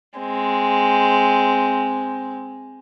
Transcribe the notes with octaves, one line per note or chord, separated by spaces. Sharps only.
G#3 C4